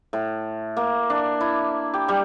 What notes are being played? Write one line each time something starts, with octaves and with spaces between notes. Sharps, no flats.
A2
A#3
D4
E4
G4
G3